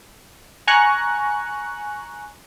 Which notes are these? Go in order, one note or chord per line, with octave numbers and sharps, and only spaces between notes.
G#5 A#5 C#6 F#6